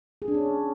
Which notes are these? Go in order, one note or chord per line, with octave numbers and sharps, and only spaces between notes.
G#4
D4
C#4